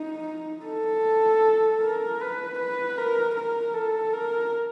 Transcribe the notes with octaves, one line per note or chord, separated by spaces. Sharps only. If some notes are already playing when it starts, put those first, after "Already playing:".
Already playing: D#4
A4
A#4
B4
B4
A#4
A#4
A4
A#4